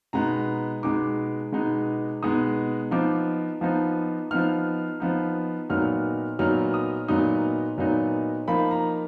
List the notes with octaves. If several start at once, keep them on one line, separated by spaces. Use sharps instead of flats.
B2 G#3 B3 D#4 A#5
B2 G#3 B3 D#4 D6
B2 G#3 B3 D#4
B2 G#3 B3 D#4 D#6
F3 B3 D#4 D6
F3 B3 D#4
F3 B3 D#4 F6
F3 B3 D#4
A#2 F#3 B3 D#4 F6
A#2 F#3 B3 D#4 F6
D#6
A#2 F#3 B3 D#4 D#6
A#2 F#3 B3 D#4
F3 A#3 D#4 B5
A#5